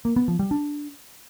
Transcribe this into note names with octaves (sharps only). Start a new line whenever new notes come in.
A#3
B3
F3
G3
D4